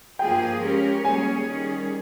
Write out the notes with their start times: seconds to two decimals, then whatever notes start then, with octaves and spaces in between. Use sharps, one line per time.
0.19 G2 F3 A#3 F4 G#4 G5
0.61 F3 G#3 C#4 G4 A#4
1.04 G3 A#3 C#4 G#4 C#5 G#5
1.47 D#3 G3 C#4 G#4